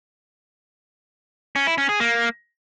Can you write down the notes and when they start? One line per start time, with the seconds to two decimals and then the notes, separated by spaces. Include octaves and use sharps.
1.56 C#4
1.67 E4
1.78 C#4
1.89 G#4
2.00 A#3